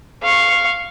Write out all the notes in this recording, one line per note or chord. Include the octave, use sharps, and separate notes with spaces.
F5 C#6